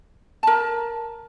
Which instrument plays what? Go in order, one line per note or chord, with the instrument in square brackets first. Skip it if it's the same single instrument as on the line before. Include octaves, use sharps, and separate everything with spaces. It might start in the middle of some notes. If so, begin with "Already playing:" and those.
[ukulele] A#4 A5